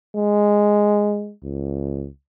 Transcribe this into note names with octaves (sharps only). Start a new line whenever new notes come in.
G#3
C#2